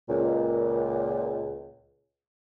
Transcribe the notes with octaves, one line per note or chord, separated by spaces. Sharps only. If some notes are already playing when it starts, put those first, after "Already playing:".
C#2 A#2